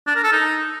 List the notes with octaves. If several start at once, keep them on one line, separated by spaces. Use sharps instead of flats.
D4
A#4
A4
D#4